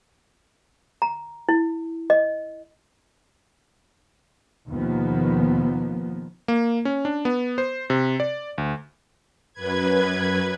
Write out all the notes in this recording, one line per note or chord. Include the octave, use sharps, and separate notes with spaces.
A#5
E4
D#5
D#2 B2 D#3 F3 A#3 B3
A#3
C#4
D4
B3
C5
C3
D5
D2
F#2 B4 G#6